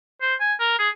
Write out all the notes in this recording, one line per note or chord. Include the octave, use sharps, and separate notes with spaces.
C5
G#5
A#4
G#4